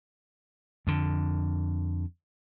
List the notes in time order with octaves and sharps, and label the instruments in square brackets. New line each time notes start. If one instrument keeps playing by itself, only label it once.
[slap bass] F2 D3